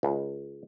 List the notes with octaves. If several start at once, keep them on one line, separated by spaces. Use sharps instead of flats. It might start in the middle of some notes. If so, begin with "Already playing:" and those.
C#2